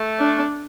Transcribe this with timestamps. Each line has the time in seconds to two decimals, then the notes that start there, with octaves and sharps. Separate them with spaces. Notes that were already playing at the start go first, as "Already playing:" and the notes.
Already playing: A3
0.19 D4